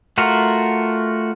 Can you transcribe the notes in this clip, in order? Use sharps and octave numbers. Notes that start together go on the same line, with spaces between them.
A3 F4 F#4 A#4